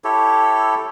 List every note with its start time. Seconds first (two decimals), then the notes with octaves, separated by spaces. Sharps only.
0.04 E4 G4 A4 C#5